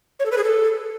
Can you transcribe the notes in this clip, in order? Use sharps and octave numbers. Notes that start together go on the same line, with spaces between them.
C#5
A4
B4
G#4
A4